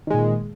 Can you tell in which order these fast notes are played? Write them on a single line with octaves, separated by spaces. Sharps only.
D#3 G#3 A#2